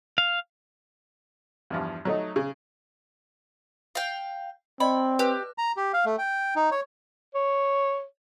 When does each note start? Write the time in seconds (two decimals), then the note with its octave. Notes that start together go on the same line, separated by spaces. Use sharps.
0.18 F5
1.70 E2 G2 F3
2.05 F#3 A3 D#4
2.36 C#3
3.95 F5 G5
4.80 C4 D5 D#5 B5
5.19 G4 B4 F#6
5.58 A#5
5.77 G4
5.93 F5
6.05 A3
6.18 G5
6.56 D#4
6.71 C#5
7.35 C#5